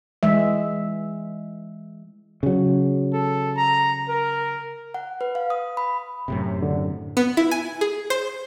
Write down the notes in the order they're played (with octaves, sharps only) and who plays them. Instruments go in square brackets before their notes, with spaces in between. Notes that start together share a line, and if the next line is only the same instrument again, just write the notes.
[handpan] E3 G#3 E5
[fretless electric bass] C#3 F#3
[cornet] A4
A#5
A#4
[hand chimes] F#5
B4
F5
D#6
B5
[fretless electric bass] F#2 A2 C3
[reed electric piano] D3
[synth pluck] B3
E4
G#5
G#4
C5